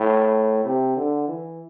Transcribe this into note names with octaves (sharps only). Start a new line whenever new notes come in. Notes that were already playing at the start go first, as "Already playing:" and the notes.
Already playing: A2
C3
D3
E3